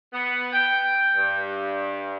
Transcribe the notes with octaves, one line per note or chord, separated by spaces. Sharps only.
B3
G5
G2